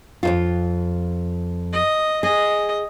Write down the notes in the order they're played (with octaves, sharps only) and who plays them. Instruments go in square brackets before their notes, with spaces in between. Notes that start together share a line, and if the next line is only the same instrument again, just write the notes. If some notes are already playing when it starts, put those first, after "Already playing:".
[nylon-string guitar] F2 G#2 F4
[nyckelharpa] D#5
[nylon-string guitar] G#4 [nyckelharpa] D#5